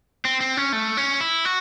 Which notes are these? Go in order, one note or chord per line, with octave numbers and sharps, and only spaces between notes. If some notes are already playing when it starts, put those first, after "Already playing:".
C4
C4
C#4
A3
C#4
E4
F#4